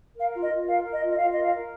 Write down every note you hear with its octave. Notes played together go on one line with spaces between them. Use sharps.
A#4 F5
F4
D#5
F4
A#4 F5
A#4
D#5
F4
D#5
F4 F5
A#4 D#5
F5
A#4